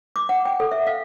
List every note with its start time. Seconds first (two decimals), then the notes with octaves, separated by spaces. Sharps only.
0.16 D6
0.29 F#5
0.45 G5
0.60 A4
0.72 E5
0.87 F5